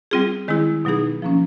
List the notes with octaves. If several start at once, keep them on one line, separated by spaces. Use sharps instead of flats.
G3 C4 F4 G#4
D#3 G#3 C4 E4 G#4
B2 F#3 B3 D#4 G#4
F3 A#3 C#4